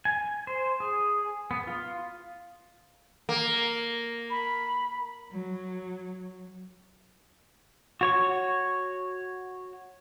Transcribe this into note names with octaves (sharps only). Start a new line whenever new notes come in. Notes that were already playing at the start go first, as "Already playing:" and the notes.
G#5
C5
G#4
B3
F4
A#3
B5
F#3
F#4 C#5 C#6